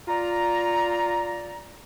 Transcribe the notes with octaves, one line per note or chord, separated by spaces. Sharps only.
F4 D5 A#5